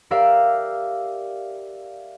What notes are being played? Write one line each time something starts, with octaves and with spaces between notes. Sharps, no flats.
G4 A#4 D5 E5 F5